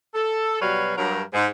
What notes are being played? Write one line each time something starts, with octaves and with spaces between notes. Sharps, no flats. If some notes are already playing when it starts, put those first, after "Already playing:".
A4
B2 F#3 G3 B4 C#5 F5
G2 F#3 A#4
G#2